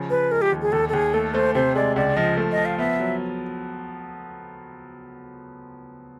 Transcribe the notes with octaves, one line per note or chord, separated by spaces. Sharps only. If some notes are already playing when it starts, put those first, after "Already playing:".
Already playing: C#3 F3
F3 B4
G#3 A#4
G4
D#2
G#4
D#2 A4
A4
D#2 G#4
A3 A4
A3 C5
C3 C5
G#3 D5
C#2 D5
F3 D#5
A3
D#5
F3
F5
B3 E5
F#3